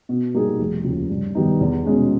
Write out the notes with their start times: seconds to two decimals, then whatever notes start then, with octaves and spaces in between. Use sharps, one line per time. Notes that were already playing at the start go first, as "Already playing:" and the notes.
0.09 B2
0.34 G3 A#3 D#4 G#4
0.59 F1
0.84 D#2 C#3 F3
1.10 G2
1.35 D#3 G3 B3 D#4
1.60 E2
1.85 B2 G#3 C#4